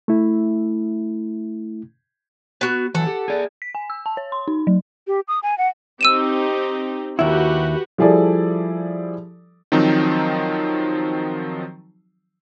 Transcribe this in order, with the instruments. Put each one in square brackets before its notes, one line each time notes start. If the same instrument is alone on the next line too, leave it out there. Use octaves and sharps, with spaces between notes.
[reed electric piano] A3 E4
[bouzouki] B3 F#4
[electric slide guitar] E3 F#3 [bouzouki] A4 F#5
[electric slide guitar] G4
G#4 D5
[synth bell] B6
G#5
E6
A5
C#5
C6
D#4
F#3
[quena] G4
D#6
G#5
F#5
[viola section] C4 D#4 G4 [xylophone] E6 D#7 E7
[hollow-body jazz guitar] D#2 E4 [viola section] F#4 G4 B4
[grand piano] F3 G3 E4 G#4 A4 D5
[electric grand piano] D#3 F3 F#3 C4 D#4